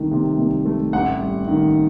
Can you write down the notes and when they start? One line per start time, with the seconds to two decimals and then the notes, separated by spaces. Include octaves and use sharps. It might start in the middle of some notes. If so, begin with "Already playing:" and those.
Already playing: C2 D#3 A3
0.11 C3
0.38 C2
0.66 A3
0.93 A1 F#5
1.20 G3
1.48 D#3